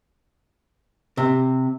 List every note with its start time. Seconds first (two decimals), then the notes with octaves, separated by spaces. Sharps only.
1.17 C3